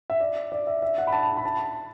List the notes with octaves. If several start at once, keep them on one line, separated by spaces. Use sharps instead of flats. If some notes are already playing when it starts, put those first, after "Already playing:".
E5
D5
D5
E5
E5
F#5
B5
A5
A5
B5
A5